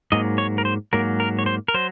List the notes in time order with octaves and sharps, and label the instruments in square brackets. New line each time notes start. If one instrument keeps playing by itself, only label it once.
[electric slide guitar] G#2 F#3 A#3 D#5
C#5
A#4
C5
G#2 F#3 A#3 A#4
A#4
C#5
C5
A#4
F#3 C5